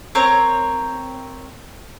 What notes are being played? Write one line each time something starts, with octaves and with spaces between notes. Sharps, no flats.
C4 A#4 C#5